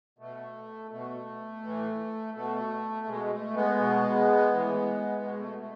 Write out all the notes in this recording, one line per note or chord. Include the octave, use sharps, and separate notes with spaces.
B2 A3
B2 A3
A2 E3
B2 A3
B2 G#3
A3
G#3 B3
B2
A2 E3
B2 G#3
A3
A3